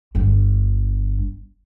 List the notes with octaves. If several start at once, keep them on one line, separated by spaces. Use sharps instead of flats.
G1 G2